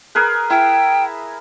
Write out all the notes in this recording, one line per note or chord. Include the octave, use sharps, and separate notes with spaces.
G#4 A#4 B4
E4 G5